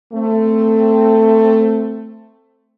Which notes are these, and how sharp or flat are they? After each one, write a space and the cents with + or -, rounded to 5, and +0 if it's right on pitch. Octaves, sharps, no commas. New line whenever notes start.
A3 +15 C4 +0